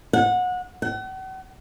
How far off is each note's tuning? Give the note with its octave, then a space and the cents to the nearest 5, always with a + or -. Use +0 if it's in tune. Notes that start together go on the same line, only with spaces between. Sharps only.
F#5 -25
F#5 +40